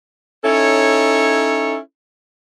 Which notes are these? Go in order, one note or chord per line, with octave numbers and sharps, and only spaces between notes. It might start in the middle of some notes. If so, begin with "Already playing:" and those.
C#4 D#4 E4 A4 C#5